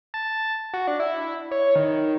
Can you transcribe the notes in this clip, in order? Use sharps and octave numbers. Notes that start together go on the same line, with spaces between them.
A5
F#4
D4
E4
C#5
D#3